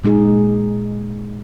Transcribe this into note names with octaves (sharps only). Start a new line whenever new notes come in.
A#2 G#3 D#4 G#4